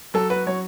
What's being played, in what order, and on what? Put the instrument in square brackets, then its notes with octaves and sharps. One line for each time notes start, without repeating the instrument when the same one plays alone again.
[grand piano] F#3 [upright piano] A4
[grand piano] F#4 [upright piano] B4
[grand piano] F#3 [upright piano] C#5